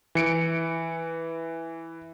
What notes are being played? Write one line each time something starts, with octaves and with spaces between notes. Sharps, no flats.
E3 C#7 D7